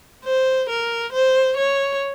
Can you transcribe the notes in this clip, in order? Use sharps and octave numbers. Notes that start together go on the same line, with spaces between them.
C5
A#4
C5
C#5